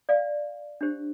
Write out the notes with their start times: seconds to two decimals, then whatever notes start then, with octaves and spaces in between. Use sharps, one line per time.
0.09 D5 F5
0.81 D4 G4 C5